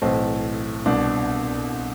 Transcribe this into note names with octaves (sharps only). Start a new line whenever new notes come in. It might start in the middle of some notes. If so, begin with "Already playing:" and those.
B1 A2 E3 C4
C2 B2 D4